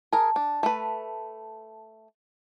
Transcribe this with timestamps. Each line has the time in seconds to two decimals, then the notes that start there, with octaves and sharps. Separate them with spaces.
0.13 G#4 A#4 A5
0.36 D4
0.63 A3 B4